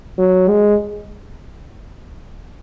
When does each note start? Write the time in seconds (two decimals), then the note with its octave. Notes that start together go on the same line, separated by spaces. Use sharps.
0.19 F#3
0.49 G#3